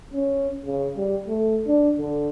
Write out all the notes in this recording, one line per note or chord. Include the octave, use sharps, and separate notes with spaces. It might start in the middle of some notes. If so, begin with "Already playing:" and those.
C#4
C#3
G3
A3
D4
D3